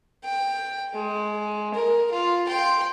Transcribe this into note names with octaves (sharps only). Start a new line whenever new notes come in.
G5
G#3
A#4
F4
G5 C6